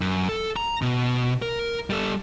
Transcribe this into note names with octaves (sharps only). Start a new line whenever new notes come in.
F#2
A4
A#5
B2
A#4
G3 A4